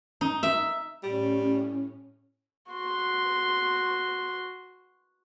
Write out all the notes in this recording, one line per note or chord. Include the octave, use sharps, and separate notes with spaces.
D#4
E5
A2 G3 C#4
F#4 C6